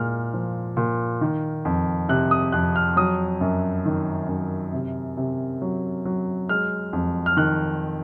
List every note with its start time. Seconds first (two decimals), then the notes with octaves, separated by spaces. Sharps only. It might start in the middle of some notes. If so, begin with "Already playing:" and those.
Already playing: A#2 G#3 F6
0.34 F3
0.77 A#2
1.21 D#3
1.65 F2
2.09 C3 F#6
2.31 D#6
2.52 F2 F#6
2.76 F6
2.96 F#3 D#6
3.41 F#2
3.85 D#3
4.29 F#2
4.73 C3
5.17 C3
5.62 F#3
6.05 F#3
6.49 G#3 F6
6.93 F2
7.26 F6
7.37 D#3 F#6